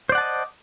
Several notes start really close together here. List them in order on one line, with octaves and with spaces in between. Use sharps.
C5 D5 F#5 A5 D#5